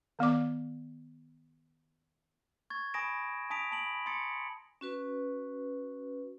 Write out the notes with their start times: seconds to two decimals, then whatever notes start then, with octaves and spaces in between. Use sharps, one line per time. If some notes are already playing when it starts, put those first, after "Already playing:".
0.19 D#3 B3 D5 D6
2.70 C#6 G#6 A6
2.94 G#5 B5 D#6 A#6 D7 E7
3.50 G#5 A5 D#6 B6 D7 F7
3.71 A5 D7 F#7
3.86 B5
4.06 A#5 C6 D#6 A6 C#7
4.81 C#4 F#4 B4